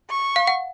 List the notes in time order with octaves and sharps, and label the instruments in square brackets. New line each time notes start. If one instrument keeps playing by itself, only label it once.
[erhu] C#6
[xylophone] F5
F#5